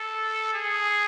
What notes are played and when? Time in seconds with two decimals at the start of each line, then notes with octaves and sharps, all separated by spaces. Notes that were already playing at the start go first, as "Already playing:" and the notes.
Already playing: A4
0.54 G#4